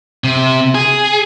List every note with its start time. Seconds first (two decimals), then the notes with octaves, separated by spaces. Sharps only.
0.24 C3
0.75 G#4